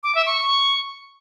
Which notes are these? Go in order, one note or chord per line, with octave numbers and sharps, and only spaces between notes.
D6
E5
C#6